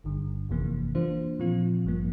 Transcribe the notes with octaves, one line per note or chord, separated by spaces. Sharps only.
G1 G2 D3
G1 F2 C3 E3 A#3
E3 A#3 D4 F4 C5
A#2 F3 C4 F4
A1 G2 F3 A#3